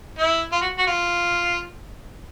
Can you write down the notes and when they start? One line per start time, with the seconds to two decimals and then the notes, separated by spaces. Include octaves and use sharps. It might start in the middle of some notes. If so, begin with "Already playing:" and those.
0.19 E4
0.52 F4
0.61 F#4
0.78 F#4
0.87 F4